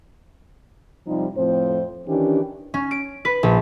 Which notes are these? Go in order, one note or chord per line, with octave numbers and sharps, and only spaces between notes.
C3 F3 G3 D#4
F2 A2 F3 C4 C5
D#3 E3 C#4 D4 G4
C#4
D7
B4
A#1